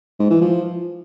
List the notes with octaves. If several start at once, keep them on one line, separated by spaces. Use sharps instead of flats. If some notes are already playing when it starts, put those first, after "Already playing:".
G#2
E3
F3